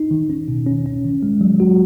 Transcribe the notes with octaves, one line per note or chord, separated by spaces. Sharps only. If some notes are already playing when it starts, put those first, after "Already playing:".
Already playing: D#4
D#3
C#4
B2
C#4
C#4
D#3
G#3
F#3
F#4